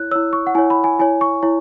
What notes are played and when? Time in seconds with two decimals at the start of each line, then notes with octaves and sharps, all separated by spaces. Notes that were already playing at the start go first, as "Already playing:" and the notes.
Already playing: E4 C#5 F#6
0.11 E4 C#5 E6
0.33 C#6
0.47 F#5
0.55 E4 C#5 G#5
0.70 B5
0.84 G#5
0.99 E4 C#5 G#5
1.21 C#6
1.43 E4 C#5